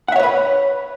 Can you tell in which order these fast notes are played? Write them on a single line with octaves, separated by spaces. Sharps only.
F#5 E5 C#5 B4 B5